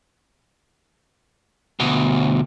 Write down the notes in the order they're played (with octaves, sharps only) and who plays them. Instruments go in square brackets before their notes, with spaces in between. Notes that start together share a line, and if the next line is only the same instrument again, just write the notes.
[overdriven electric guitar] D2 B2